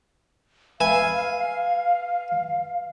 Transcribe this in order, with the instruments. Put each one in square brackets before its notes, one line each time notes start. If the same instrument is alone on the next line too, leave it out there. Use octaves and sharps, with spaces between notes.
[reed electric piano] B4 E5 [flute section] F5 [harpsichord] G#5